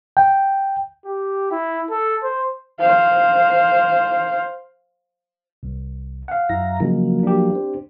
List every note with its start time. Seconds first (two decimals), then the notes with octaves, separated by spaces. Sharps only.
0.17 G5
1.05 G4
1.51 E4
1.90 A4
2.23 C5
2.80 C5 F5
5.63 C2
6.28 F5 F#5
6.49 F#2 E4 A#5
6.80 C#3 F3 F#3 G#3 A#3
7.23 D4 G4
7.55 C4